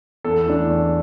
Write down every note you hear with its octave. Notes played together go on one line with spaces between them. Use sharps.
E2 A4
E3 A3 D4
E2